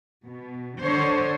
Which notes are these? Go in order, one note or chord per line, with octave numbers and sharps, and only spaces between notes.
B2
D3 C5 C#5